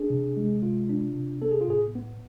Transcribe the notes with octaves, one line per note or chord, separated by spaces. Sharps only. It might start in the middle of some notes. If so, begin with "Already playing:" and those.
Already playing: D4 G#4
C3
G#3
C3 F4
D4
C3
B3 A4
G#4
F4
A2 G#4
B3